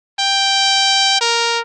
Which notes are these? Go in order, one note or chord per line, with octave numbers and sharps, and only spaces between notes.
G5
A#4